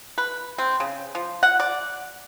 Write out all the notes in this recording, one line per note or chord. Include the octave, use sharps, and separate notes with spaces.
B4
C4
C#3
F3
F#5
D5